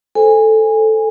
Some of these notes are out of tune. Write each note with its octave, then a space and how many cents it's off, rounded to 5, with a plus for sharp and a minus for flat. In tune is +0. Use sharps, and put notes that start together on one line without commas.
A4 +0 C5 +0 G#5 -15